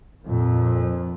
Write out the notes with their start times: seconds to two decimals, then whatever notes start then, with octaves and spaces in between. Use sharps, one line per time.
0.23 F2 A#2